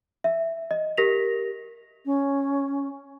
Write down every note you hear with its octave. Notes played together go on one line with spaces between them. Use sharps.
E5
D#5
G4 A#4 A#6 B6 F7
C#4